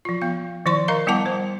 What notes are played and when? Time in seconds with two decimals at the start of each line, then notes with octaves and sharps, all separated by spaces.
0.05 F3 F4
0.22 B3 F5
0.66 D#3 F3 E4 D5 C6 C#6
0.88 A#4 D#5 F5 A#5
1.07 G3 B3 E4 F#5 A5 D6
1.26 C5